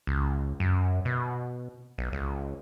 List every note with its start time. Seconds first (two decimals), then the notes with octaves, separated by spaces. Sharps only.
0.07 C#2
0.60 F#2
1.05 B2
1.98 B1
2.13 C#2